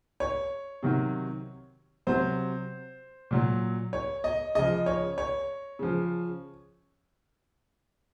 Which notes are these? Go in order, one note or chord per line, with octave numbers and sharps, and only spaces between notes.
C#5
C3 D#3 F#3
C3 F#3 C5
A#2 F#3
C#5
D#5
C#3 F3 D#5
C#5
C#5
C#3 F3